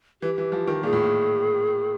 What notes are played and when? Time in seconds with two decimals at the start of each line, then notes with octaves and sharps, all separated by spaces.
0.21 E3 G4
0.38 E3
0.52 F3
0.67 D#3
0.83 A#2 G#4
0.93 A2
1.03 A#2